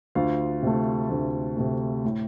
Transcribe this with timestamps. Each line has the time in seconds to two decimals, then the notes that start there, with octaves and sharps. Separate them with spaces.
0.15 D2 F4 F5
0.63 C3 A3
1.10 D2
1.57 C3 A3
2.04 A2